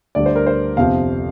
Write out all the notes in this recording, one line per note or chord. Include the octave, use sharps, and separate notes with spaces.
D2 D3 G3 D5
C5
A#4
C5
G1 F2 C3 F3 F5